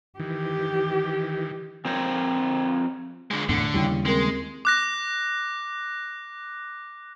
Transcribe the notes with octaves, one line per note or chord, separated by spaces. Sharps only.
D#3 E3 G4
F3 C4 A#4 C5 C#5
D3 G#3
E2 A2 D3
D#2 C#3 G3 E4 G5
G#3 C4 A#4 C6
D6 F#6 A#6